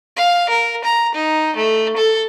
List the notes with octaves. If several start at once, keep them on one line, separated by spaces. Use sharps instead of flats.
F5
A#4
A#5
D#4
A3
A4